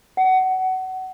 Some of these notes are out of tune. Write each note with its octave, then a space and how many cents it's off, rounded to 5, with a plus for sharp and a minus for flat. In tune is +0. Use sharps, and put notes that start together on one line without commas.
F#5 +25